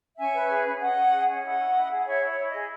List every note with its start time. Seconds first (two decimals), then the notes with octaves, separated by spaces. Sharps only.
0.17 C#4 E5 G#5
0.34 B4
0.49 G#4
0.65 C#4
0.80 C#4 D#5 F#5
0.97 C#4
1.12 G#4
1.29 C#4
1.44 E4 D#5 F#5
1.60 E4
1.75 E4
1.91 G#4
1.98 F#5
2.07 E4 C#5 E5
2.22 E4
2.28 C#5
2.39 E4
2.49 D#5
2.54 G#4